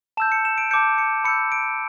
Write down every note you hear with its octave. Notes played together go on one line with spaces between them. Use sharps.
A5 E6 G6 E7
C#7
E7
D7
A5 D6 G6 C#7
C#7
B5 E6 G6 C#7
D7